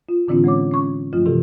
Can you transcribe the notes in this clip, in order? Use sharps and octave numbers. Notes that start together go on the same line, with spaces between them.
F4
A2 D3 E3 C4 D4 F4
G#3 C#4 C#5 D6
C#4 C#6
G2 F3 A3 F4
C3 E3 F#4 G4 A4